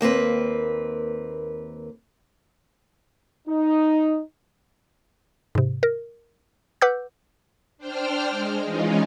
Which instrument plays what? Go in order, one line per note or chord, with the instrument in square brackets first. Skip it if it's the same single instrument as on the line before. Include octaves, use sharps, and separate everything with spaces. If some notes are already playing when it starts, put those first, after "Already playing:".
[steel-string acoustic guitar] D#2 A#3 C4 B4
[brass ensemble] D#4
[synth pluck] G#2 C3
A#4
B4 F#5 D6 E6 G6
[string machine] D4 C5 G5 F6
G#3
E3 G#3 C#4 D#4 F4